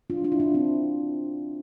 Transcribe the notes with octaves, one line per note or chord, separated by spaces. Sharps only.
D4 F4
D4 F4
E4
D4 F4
C4 E4